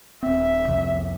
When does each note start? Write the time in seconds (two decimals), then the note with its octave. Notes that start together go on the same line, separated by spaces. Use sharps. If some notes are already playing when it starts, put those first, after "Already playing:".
0.23 D#1 C4 E5
0.68 C2 F2 C3